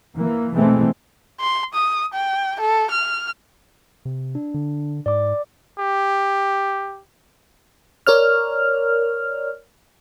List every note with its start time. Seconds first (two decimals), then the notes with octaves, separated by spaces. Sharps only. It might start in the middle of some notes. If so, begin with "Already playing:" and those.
0.15 E3 A#3
0.53 B2 E3 G#3 A3 C4
1.40 C6
1.74 D#6
2.14 G5
2.60 A4
2.91 F6
4.05 C3
4.35 D4
4.54 D3
5.06 G#2 D5 D6
5.79 G4
8.07 A#4 C#5 D5 F6